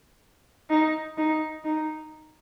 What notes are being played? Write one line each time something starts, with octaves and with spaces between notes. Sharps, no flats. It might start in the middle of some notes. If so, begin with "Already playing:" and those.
D#4
D#4
D#4